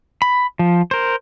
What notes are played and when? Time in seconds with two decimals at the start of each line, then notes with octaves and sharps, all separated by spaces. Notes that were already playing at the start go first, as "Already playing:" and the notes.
0.22 B5
0.59 F3
0.91 A#4 C5